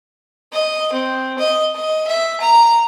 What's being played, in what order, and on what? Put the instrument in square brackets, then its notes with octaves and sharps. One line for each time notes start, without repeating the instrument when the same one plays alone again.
[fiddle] D#5
C4
D#5
D#5
E5
A#5